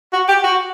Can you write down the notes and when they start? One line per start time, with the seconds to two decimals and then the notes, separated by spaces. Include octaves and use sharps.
0.13 F#4
0.29 G4
0.44 F#4